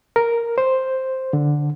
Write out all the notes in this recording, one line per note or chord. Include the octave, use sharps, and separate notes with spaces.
A#4
C5
D3